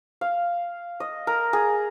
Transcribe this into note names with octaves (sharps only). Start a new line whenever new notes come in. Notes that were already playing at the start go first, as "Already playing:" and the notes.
F5
D#5
A#4
G#4